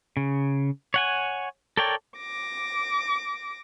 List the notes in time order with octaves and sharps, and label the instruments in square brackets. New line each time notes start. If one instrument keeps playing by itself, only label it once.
[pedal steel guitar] C#3
C#5 F#5 G#5
A4 A#4 C#5 D5 G5
[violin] D6 A#6